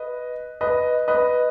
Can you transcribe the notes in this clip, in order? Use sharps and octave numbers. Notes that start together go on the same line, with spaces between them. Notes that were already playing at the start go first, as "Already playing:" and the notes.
Already playing: B4 D#5
B4 D#5
B4 D#5